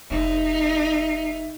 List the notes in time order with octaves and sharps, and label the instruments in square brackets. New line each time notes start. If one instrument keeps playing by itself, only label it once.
[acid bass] F1 [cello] D#4 [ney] E5